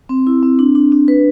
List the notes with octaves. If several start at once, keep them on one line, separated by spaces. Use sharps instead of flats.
C4
E4
C4
D4
D4
D4
B4